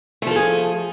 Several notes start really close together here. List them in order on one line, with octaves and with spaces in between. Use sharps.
A3 F3 A4 G#4